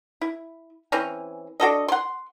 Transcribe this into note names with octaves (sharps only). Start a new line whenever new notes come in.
E4
E3 C4 C#4
D4 F#4 A4 D#5
F#5 C6